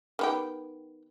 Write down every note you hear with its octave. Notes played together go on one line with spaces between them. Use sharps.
D#3 B3 G4